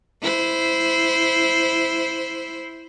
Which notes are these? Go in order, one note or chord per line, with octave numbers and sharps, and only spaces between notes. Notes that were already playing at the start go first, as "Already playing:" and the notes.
E4 C5